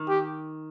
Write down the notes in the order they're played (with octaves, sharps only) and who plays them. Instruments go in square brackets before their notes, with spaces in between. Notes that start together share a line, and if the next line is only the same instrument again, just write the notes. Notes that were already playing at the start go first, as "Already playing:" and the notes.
Already playing: [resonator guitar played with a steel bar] D#3
[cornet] G4